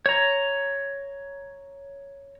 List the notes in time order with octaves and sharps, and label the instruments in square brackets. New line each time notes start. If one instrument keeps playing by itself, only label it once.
[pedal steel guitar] C#5 A#5